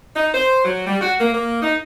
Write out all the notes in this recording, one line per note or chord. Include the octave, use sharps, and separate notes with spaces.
D#4
C5
F#3
G3
F#4
A#3
A#3
D#4